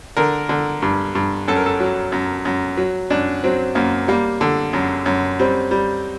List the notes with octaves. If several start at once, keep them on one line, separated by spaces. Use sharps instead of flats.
D3 A#4
D3
G2
G2
F#2 A4
A#4
A4
F#3
F#2
F#2
F#3
F#2 D4
F#3 C4
F#2 A#3
G3 A#3
D3
F#2
F#2
G3 C4
G3